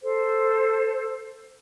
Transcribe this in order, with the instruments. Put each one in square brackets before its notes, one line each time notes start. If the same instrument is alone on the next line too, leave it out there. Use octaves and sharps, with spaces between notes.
[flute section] A4 C5